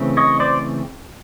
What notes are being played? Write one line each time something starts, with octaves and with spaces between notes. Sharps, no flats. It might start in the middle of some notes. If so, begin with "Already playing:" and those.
Already playing: C#3 E3 A3 C4
C#5 D#5
C5 D5